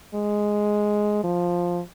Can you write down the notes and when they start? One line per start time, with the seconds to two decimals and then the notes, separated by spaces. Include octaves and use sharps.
0.14 G#3
1.24 F3